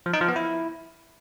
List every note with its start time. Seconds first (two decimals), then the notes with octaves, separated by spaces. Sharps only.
0.06 F3
0.13 D#4
0.21 F3
0.28 B3
0.36 E4